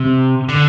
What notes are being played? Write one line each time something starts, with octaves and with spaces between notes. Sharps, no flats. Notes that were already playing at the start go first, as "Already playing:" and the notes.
Already playing: C3
D3